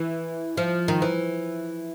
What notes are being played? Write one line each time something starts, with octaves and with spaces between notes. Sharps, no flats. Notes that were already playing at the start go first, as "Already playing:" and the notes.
Already playing: E3
F3
D#3
E3